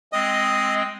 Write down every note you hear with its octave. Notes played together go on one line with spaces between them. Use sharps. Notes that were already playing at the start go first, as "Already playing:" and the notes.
G#3 C4 D#5